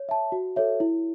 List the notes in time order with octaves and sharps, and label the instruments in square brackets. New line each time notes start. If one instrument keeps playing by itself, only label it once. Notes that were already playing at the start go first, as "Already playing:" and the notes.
Already playing: [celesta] C#5
E5 A5
F#4
A4 C#5 E5
E4